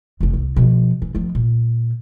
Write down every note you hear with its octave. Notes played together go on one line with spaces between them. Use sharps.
F1 C#3
C2
B2 F3
E3
D#3 F3
A#2